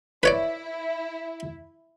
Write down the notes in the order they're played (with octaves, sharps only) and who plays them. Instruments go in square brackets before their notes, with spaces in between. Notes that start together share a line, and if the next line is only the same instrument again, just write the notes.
[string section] E4 [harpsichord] B4 C#5 D5